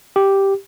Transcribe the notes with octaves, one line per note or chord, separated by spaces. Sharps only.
G4